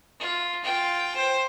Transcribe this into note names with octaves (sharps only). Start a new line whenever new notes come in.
F4
F4 G5
C5